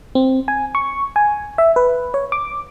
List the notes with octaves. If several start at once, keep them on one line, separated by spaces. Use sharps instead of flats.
C4
G#5
C#6
G#5
E5
B4
C#5
D6